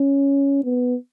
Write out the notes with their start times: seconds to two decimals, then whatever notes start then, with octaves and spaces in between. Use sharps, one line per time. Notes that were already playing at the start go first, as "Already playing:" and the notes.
Already playing: C#4
0.64 B3